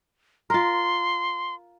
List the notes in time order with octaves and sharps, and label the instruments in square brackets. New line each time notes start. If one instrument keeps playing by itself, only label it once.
[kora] F4 A#4 [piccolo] C6